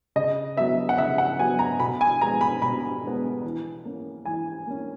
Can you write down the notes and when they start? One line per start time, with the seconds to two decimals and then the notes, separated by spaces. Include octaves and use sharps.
0.16 C#3 D#5
0.57 F#3 B3 E5
0.89 F#5
0.98 C#3 E5
1.18 F#5
1.39 F#3 B3 G#5
1.59 A#5
1.79 B2 B5
2.01 G#5
2.21 G#3 B3 A#5
2.41 B5
2.62 B2 B5
3.03 G#3 B3
3.44 E3
3.85 A#3 C#4
4.25 E3 G#5
4.67 A#3 C#4